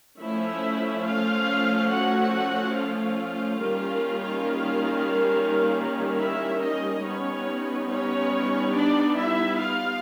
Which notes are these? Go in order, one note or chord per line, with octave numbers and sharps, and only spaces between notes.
F3 A3 C#4 E4 E5
F4 F5
F#4 F#5
F4 F5
D#3 G3 A#3 C#4
E4 E5
D#4 D#5
G3 B3 C#4 D#4 C#5
C#4 C#5
D4 D5
E4 E5
F4 F5